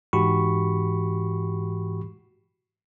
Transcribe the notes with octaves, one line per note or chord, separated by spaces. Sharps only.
G#2 E3 F#4 G4 B5 C#6